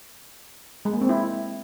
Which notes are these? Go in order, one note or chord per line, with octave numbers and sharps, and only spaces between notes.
G#3
A#3
C4
E4